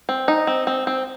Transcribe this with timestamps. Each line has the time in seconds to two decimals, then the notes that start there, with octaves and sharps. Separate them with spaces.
0.09 C4
0.28 D#4
0.47 C4
0.67 C4
0.87 C4